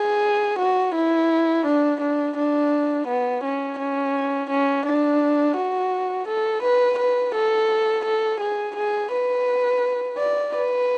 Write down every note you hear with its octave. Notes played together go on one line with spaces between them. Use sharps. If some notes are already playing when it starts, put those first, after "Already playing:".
Already playing: G#4
F#4
E4
D4
D4
D4
B3
C#4
C#4
C#4
D4
F#4
A4
B4
B4
A4
A4
G#4
G#4
B4
D5
B4